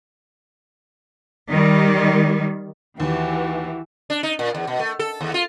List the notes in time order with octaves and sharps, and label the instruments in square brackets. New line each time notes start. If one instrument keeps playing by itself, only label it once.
[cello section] D#3 G3
[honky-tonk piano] D#2 [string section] E3 [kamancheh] F#4 G4
[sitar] D4
D#4
A#2
E2
B2
A3
A4
D#2
F4